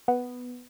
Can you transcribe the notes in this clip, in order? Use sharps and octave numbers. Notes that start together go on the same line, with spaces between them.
B3